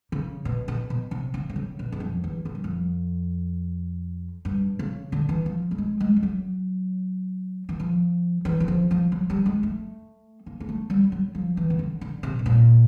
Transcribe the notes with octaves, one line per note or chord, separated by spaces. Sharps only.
C#3
B2
B2
B2
C3
C#3
C3
C#3
B2
E2
F2
E2
F2
F#2
F2
G2
C#3
D3
E3
F3
G3
G#3
G#3
G3
F#3
E3
F3
E3
E3
F3
F3
F#3
G3
G#3
A3
A#3
A#3
A3
G3
G3
F#3
F3
E3
C#3
D3
D3
C3
B2
A#2